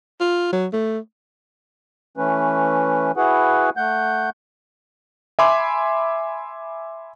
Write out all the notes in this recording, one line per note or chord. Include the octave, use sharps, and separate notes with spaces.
F4
F#3
A3
E3 A3 C#4 B4
E4 F#4 G#4 B4 F#5
A3 F#5 G6
E5 G#5 B5 C6 D6